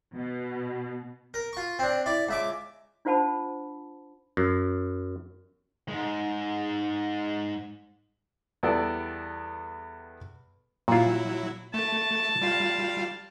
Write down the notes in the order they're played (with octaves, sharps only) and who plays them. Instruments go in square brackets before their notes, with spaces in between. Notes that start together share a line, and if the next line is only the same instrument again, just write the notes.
[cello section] B2
[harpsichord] A#4
F4 C#6
C4 D4
E4 D5
C#2 E5 D6
[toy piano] D4 F4 C5 F#5 A5 B5
[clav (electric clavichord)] F#2
[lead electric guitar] G#2 G#3
[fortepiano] E2 G3 B3 A4 D5
[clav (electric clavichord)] A#2 F4 [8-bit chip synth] F#3 E4
[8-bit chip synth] A3 [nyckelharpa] A5
[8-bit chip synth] G3 F4 F5